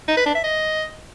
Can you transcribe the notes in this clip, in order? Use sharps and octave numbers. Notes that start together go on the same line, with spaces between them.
D#4
B4
D4
E5
D#5